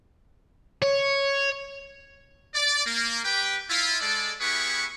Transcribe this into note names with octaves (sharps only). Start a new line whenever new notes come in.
C#5
D5
A#3
G4 B4 G5
E4 F4
G#3 A4 D5
B3 E4 G4 G#4 B4 C#6